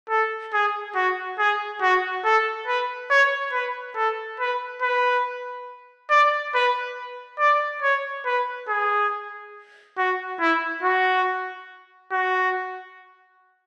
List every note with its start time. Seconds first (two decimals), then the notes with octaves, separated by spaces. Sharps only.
0.09 A4
0.53 G#4
0.95 F#4
1.39 G#4
1.82 F#4
2.24 A4
2.68 B4
3.10 C#5
3.53 B4
3.96 A4
4.40 B4
4.82 B4
6.10 D5
6.54 B4
7.39 D5
7.82 C#5
8.26 B4
8.68 G#4
9.97 F#4
10.40 E4
10.83 F#4
12.12 F#4